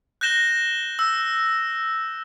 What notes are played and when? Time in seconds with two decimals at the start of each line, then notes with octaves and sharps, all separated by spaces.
0.21 F#6 G6 A#6 E7 G7
0.99 E6